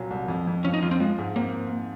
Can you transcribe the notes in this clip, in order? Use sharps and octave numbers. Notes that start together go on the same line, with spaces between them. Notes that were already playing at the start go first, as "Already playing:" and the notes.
Already playing: C2 A#2 F#3
C2
F2
F2
F3 C#4
D#4
F2 F4
C4
F3 G#3
G#2
A#3 C4